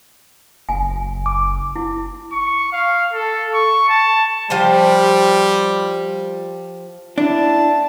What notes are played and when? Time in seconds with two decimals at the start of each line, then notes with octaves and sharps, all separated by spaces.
0.69 F#1 G#5
1.26 D6
1.76 E4
2.32 C#6
2.72 F5
3.13 A4
3.54 C#6
3.89 A5
4.50 F3 G3 G4 C5
7.18 D4 E4 A5